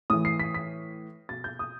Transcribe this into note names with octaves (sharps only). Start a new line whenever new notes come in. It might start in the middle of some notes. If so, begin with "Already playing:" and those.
A2 E3 D#6
C7
B6
B6
B2 A6
G6
D#6